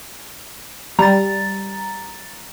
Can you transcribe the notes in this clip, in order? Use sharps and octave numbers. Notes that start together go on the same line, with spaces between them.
G3 A#5 A6